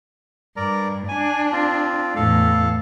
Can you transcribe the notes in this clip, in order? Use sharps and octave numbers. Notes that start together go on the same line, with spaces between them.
G2 A#4 D5 A#5
D4 G#5
C4 F4
E2 A2 A4 F5